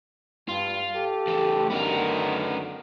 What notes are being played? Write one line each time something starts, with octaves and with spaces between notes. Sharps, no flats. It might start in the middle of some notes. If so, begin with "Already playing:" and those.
G2 F4
G4 A4
E2 A3
F#2 D3 D#3 B3 A#4